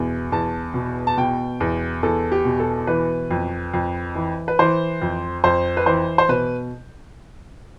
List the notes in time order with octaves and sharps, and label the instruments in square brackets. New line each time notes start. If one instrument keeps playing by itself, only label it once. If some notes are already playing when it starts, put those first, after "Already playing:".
Already playing: [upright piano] E2 B2
E2 A5
B2
A5
B2 G5
E2
E2 A4
G4
B2
A4
E3 B4
F2
F2
E3
B4
E3 C5
F2
F2 C5
B4
E3 C5
C5
B2 B4